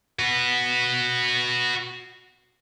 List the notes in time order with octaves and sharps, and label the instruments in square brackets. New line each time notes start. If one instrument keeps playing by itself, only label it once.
[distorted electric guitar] F#4 B4